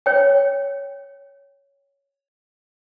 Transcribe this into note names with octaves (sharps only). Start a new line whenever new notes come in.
C#5 G5